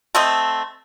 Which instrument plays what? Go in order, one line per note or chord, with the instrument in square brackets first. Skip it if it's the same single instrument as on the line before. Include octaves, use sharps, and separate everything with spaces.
[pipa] A3 C4 D#5